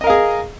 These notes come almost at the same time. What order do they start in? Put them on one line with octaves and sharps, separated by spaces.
D#5 A#4 F5 G#4